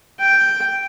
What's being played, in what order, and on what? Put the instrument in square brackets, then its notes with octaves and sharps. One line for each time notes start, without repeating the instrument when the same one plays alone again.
[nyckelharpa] G5